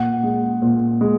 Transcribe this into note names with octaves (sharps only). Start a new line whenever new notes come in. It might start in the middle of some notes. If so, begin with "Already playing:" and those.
Already playing: A#2 F#5
G#3
A#2
G#3